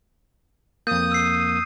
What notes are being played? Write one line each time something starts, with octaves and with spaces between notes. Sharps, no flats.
F2 A#3 D#6 G6
E6 C7